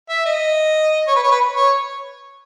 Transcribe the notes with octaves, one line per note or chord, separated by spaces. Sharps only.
E5
D#5
C#5
B4
C#5
B4
C#5